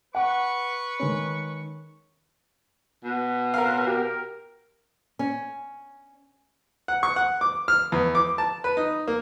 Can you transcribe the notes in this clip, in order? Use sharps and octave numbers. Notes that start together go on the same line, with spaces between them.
B4 F#5 C#6
D#3 G#3 C#4
B2
A2 C4 A#4 F5
G4 A#4
C#4
F#5
C#6
F#5
D6
F6
E2
D6
A5
B4
D#4
A#3